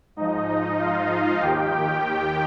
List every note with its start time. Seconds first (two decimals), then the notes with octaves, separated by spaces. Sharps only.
0.16 G#2 F3 D#4 D#5
0.47 D#4 D#5
0.78 F4 F5
1.41 D#2 D#3 G4 G5
1.72 G4 G5